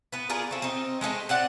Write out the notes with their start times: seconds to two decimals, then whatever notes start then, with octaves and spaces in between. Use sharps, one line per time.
0.12 B3 B4
0.30 F4 G#4 A#4 D5
0.51 A3 C4
0.62 C4 D#4
1.01 G#3 A3 C4 D#4
1.29 C4 D5 F#5